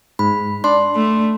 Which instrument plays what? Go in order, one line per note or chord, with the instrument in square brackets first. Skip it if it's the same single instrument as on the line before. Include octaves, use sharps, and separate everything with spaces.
[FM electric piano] G#2 [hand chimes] B5
[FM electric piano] D4 [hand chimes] C6
[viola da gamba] A3